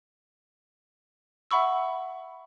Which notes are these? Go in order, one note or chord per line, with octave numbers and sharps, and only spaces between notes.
E5 F#5 B5 C#6 E6